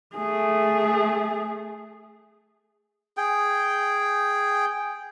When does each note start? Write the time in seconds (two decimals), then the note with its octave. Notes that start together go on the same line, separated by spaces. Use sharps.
0.15 A3 G#4
3.17 G#4 G5